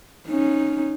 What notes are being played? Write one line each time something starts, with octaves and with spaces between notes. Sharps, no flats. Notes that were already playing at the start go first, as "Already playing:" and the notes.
C#4 D#4